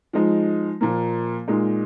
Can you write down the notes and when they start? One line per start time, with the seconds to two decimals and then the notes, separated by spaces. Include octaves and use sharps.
0.13 F3 G#3 D#4
0.81 A#2 F3 A#3
1.48 A#2 G#3 D#4